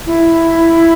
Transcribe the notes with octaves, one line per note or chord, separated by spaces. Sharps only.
E4